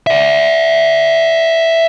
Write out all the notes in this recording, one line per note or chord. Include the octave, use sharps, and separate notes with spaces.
D5 E5